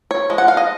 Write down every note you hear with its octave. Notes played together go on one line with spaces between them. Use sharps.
C#5
F3 G#3
F#5
F5
D#5